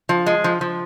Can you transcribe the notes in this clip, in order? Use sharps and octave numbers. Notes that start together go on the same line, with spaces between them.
F3
G#3
F3
F3